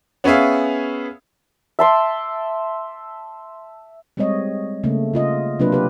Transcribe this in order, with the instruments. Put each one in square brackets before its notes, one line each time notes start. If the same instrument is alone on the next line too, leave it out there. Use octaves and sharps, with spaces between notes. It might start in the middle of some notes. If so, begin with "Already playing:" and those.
[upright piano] B3 C#4 G#4 E5 F5
[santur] E5 A5 C6 D6
[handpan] G3 G#3 C4 C#5 D#5
C#3 A3 A#3
C#3 F4 D#5
C3 F#3 A#3 D4 F4 B4
G4 B4